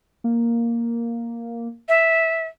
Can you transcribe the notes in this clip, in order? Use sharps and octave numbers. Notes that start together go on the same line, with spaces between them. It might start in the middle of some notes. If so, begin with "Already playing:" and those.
A#3
E5